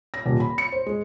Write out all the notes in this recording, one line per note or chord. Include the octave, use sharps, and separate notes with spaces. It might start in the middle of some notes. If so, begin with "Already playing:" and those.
A#6
D#1
B5
C#7
C5
G#3